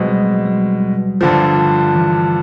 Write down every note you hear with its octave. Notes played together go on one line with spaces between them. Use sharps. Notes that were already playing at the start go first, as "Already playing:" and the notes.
Already playing: B2 F#3 G#3 C4
G3
G3
G2 D3 F3
E3